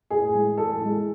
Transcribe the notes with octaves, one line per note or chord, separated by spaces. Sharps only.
A2 G#4
E3 G#3
A2 A4
E3 G#3